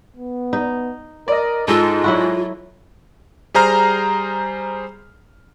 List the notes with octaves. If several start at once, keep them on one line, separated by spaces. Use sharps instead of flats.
B3
D#4
A#4 D5 D#5
G#2 G#3 D#4 F4 A4 E6
F#3 E4 F#4
G3 G#4 C5 A#5 F6